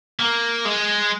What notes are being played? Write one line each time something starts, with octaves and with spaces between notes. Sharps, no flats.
A#3
G#3